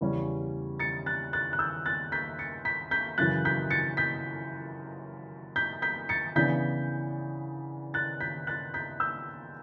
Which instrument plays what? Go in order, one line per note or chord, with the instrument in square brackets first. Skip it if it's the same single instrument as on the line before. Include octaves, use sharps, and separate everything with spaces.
[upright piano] E2 C#3 G3 C#4
A6 C#7
F#6 A6
F#6 A6
F#6
E6 G6
F#6 A6
G6 B6
A6 C#7
G6 B6
G6 B6
F#2 C#3 E3 F#6 A6
G6 B6
A6 C#7
G6 B6
G6 B6
G6 B6
A6 C#7
C#3 E3 B3 D4 G6 B6
F#6 A6
G6 B6
F#6 A6
G6 B6
E6 G6